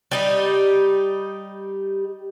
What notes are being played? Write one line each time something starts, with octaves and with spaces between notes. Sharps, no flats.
G3 D#4 G4